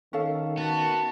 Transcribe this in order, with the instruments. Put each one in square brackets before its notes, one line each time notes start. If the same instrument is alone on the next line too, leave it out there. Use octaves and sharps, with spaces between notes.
[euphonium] D#3 [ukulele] C#4 A4 F5
[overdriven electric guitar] B3 [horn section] F#4 A5